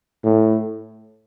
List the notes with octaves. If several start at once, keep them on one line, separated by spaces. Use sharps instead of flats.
A2